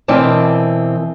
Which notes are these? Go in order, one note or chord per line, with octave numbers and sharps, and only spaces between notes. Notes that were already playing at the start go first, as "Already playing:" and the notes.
B2 E3 C4 A#4 D5 A5